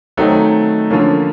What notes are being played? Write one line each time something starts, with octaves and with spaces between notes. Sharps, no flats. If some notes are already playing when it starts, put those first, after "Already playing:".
D#3 F#3 A3 C4 D#4
D3 F3 A#3 C#4